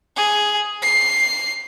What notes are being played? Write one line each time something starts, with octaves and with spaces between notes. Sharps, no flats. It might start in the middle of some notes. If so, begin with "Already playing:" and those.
G#4
C7